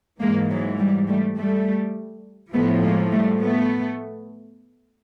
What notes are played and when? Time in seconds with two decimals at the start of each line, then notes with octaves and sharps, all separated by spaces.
0.21 G#2 E3 G#3 A#3
0.50 F#3 G#3
0.79 G3
1.08 G3 A3
1.37 G3 A3
2.53 F3 A3 B3
2.58 A2
2.82 G#3 A#3
3.11 G3 A3
3.41 A3 B3